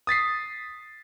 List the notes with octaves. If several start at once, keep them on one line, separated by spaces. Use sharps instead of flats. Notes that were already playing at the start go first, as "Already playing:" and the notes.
D#6 A6 B6 C7